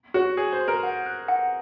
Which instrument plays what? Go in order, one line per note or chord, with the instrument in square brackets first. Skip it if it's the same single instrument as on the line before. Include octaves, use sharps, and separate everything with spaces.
[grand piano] F#4 [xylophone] C#5
[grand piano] G#4 [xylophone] C#5
[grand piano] C5
[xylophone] C6
[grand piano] A#4
[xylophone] F#5
F#6
F#5